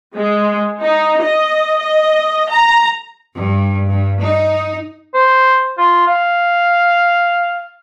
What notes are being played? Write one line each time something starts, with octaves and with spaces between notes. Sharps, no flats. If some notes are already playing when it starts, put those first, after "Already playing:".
G#3
D#4
D#5
D#5
A#5
G2
G2
D#4
C5
F4
F5